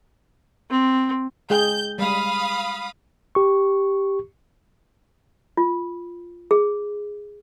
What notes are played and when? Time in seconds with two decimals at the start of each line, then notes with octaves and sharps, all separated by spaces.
0.70 C4
1.50 G#3 G#4 G5 G6
1.98 G3 G#3 F5 B5 D#6
3.35 G4 C#6
5.57 F4
6.51 G#4